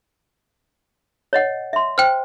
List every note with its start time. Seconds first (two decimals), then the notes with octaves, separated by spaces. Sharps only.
1.33 C#5 D#5 F#5
1.73 E5 C6
1.98 C5 G5 F6